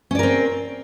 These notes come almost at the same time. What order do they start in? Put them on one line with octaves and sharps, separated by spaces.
C#4 D5 A#4 C4